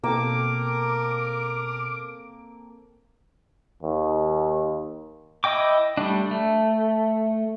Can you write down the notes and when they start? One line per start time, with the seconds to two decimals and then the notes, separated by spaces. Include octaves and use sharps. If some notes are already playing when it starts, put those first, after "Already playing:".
0.04 B2 A#3 C4 A4 A#4 D6
3.83 D#2
5.44 E4 D#5 G5 D6
5.97 G3 A3 D4
6.31 A3